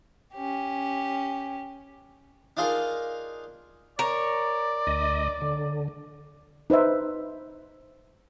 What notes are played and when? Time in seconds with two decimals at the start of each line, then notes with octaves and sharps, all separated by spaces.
0.35 C#4 G4
2.57 D4 D#4 F4 G#4 A#4
3.99 A#4 C#5 D5
4.87 D2 D#5
5.41 D3
6.70 D#4 B4 C5 E5